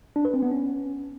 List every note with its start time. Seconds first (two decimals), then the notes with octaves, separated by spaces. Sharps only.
0.16 D4
0.25 B4
0.34 C4
0.43 B3
0.51 C#4